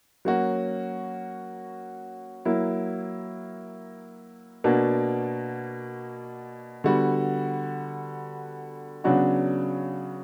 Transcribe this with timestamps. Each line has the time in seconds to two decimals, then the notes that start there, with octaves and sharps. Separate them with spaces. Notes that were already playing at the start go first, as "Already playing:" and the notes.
0.25 F#3 A#3 C#4 F#4
2.45 F#3 A#3 E4
4.64 B2 A#3 D4 F#4
6.84 D3 G3 B3 F#4
9.04 C#3 F#3 B3 D4 F#4